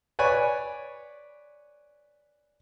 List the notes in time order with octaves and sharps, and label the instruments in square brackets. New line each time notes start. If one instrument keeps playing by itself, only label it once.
[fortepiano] B4 C#5 D5 G#5 C#6